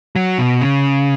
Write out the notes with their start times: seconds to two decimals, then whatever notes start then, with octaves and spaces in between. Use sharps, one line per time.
0.16 F#3
0.38 B2
0.61 C#3